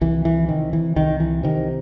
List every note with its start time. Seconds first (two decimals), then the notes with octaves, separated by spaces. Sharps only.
0.01 C2 E3
0.25 E3
0.49 C3 D#3
0.73 E3
0.96 C2 D#3
1.20 E3
1.43 C3 D#3